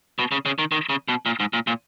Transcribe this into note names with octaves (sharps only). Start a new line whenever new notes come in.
B2
C#3
C#3
D#3
D#3
C#3
B2
A#2
G#2
A#2
A#2